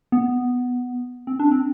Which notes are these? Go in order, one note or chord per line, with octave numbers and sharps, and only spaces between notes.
B3
C4
D4
C4